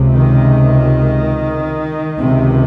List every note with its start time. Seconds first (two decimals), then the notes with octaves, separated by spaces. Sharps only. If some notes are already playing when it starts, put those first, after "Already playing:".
Already playing: C#2 C3
0.14 D#3
2.17 C#2 C3